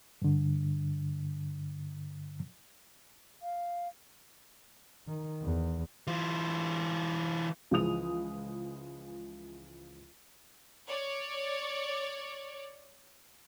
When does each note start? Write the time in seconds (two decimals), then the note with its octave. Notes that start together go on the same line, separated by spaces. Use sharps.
0.22 G2 D3
3.40 F5
5.07 D#3
5.43 E2
6.07 E3 F4
7.71 C#2 E3 F3 G#4 D#6 F7
10.87 C#5 D5